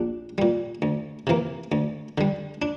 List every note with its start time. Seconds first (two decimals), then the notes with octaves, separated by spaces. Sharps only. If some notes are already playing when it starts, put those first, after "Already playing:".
Already playing: A#1 D4
0.38 A#2 G3
0.82 D2
1.27 C3 E3 A#3
1.72 D2
2.18 D3 G3
2.62 D4